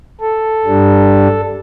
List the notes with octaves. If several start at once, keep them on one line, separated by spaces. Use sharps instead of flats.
A4
G2 G3 D4